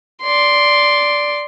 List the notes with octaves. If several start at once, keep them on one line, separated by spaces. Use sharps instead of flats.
D5 C6